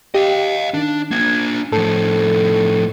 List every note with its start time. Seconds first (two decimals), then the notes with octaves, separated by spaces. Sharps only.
0.15 G4 D#5 F5
0.74 D#3 D4
1.11 A#3 D4 G#6
1.72 A2 F3 A4